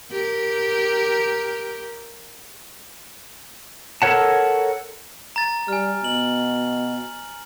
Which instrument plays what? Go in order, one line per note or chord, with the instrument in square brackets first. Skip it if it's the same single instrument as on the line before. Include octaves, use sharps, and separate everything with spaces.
[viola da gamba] G4 A#4
[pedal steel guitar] A4 A#4 C#5 F#5 A5
[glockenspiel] A#5 A6
[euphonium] G3 [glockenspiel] G#5 F6
[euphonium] B2 [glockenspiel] F#7